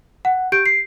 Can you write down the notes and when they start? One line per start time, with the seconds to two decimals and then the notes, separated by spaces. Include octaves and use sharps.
0.25 F#5
0.52 G4 G6 D7
0.66 C7